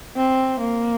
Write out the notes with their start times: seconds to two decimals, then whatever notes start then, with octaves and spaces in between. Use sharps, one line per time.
0.17 C4
0.60 A#3